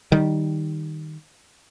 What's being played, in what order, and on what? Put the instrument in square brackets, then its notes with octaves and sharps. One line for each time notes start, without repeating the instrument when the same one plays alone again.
[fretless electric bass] D#3 G3